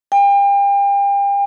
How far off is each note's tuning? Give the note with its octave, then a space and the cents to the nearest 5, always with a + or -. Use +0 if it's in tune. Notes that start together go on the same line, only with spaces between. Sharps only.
G5 +35